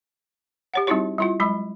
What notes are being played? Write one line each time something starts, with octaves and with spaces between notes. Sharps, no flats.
G4 C#5 F#5
G3 C4 D#4 E4 F#4 C#5
G3 E4 F4
F#3 G#3 B5